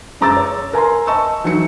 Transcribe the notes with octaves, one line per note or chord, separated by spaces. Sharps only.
F#2 G#3 A#5 D6 E6 A6
C#5
A#4 G#5 A#5 C6
D#5 A5 C#6 E6
E3 F#3 D#4 C#7